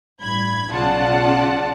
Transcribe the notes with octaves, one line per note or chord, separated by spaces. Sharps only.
A1 G2 B5 G#6
B1 C#3 F4 D5 F#5 A5